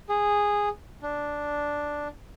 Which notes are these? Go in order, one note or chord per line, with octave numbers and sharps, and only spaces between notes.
G#4
D4